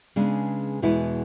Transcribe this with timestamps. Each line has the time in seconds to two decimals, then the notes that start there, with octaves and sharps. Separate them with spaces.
0.16 C#3 G#3 B3 D4
0.82 E2 B2 G#3 B3 E4